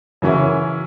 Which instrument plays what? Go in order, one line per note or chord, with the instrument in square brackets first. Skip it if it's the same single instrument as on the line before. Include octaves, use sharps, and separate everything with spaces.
[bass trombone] F#2 [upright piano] C#3 E3 C#4 E4